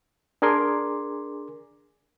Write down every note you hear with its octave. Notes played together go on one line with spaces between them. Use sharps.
D4 G#4 A#4 G#5 C6 D6